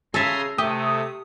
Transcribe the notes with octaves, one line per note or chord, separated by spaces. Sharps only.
C#3 A4 E5 G#5 A#5 C6
C3 A3 G4 D#6